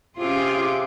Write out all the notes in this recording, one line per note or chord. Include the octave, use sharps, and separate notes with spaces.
C3 C#4 F4 G#4 C6 D6